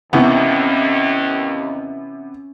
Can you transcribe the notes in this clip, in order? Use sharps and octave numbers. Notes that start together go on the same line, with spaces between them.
D#2 C3 E3 B3 C#4